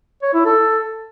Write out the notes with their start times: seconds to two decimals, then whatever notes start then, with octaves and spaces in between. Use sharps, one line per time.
0.22 C#5
0.34 E4
0.45 A4